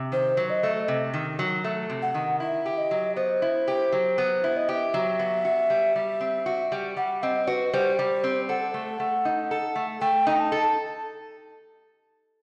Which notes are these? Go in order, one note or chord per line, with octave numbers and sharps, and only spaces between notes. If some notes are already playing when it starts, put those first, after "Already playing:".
Already playing: C3
D#3 C5
F#3
D#5
A3
C3
D#3
F#3
A3
C3
F#5
D#3
E4 E5
G4
D#5
F#3
B3 C5
E4
G4
F#3
B3
E4
D#5
G4 E5
F#3
B3
F#4
G3
G3
C4
F#4
G3
G3 F#5
C4 D#5
F#4 B4
G3 C5
G3
C4
A4 F#5
A3
A3
D#4
A4
A3
A3 G5
D#4 G5
A5
A4